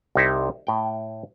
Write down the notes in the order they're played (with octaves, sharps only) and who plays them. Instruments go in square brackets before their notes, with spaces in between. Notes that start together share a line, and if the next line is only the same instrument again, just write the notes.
[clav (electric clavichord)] C2 C3 D#4 E4 E5
A2 G5